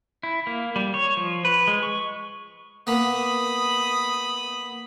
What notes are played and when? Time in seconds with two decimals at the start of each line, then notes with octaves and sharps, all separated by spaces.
0.23 E4
0.47 A#3
0.76 G3
0.94 C#5
1.17 F3
1.45 B4
1.67 G#3
1.83 C#6
2.87 A#3 B3 B5 D#6